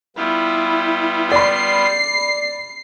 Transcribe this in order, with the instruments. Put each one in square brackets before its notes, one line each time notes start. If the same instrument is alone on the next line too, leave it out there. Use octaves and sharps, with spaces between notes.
[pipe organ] G3 B3 F4 [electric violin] E4
[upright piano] D5 B5 [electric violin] C7